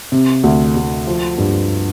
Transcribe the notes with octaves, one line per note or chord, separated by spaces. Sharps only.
C3
D2
D2
F3
G2